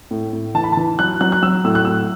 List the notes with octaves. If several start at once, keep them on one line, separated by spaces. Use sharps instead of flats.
A2
A2
E3 A5
B5
A5
E3
F#3 F#6
F#3 F#6
F#6
F#3 E6
A2 E6
F#6
A2 E6